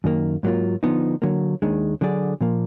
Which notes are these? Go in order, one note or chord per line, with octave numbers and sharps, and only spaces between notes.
F#2 D#3 A#3
G#2 F#3 A#3 F4
D3 F3 B3 D#4
D3 F#3 A#3
D#2 D#3 G#3 D4
D3 F#3 D4 G#4 D5
A#2 F3 A#3